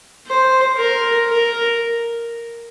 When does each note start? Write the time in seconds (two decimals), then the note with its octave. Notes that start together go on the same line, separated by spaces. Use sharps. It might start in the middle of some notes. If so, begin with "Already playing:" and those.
0.27 C5
0.78 A#4
1.28 A#4